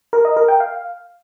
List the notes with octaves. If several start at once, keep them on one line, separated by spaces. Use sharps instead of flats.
A#4
D#5
A#4
G5
F5